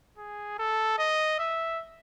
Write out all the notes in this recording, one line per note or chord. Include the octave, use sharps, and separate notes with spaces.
G#4
A4
D#5
E5